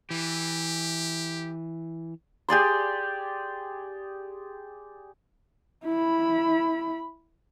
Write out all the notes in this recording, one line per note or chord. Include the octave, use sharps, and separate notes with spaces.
E3 G4
G4 G#4 D5 C6
E4 B5